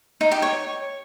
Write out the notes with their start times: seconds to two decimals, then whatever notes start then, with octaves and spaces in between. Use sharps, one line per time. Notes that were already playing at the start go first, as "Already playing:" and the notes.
0.21 D#4
0.31 G4
0.42 C#5